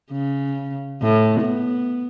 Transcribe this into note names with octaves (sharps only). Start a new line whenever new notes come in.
C#3
A2
B3